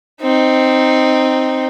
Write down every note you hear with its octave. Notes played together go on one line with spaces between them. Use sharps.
C4 D#4